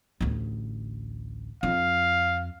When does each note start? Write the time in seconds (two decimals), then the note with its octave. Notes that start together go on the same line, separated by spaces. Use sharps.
0.21 A1 D2
1.63 F2 F4 F5